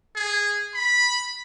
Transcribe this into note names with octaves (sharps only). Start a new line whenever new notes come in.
G#4
B5